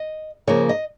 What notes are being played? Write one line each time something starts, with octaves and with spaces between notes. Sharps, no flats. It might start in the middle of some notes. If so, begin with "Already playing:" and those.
Already playing: D#5
C#3 F3 A#3 C#5
D#5